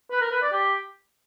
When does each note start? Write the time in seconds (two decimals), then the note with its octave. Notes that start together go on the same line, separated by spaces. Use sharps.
0.11 B4
0.21 A#4
0.32 B4
0.42 D5
0.52 G4